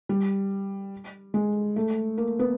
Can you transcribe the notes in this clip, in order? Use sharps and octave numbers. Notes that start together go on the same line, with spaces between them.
G3
G#3
A3
A#3
B3